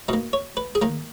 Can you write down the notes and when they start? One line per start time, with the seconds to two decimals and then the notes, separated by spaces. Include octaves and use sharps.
0.08 B2 A#3 D#4
0.33 C#5
0.57 B4
0.75 G#4
0.82 D#3 A#3 A#4